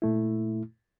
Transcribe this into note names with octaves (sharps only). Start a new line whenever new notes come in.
A#2 A3 E4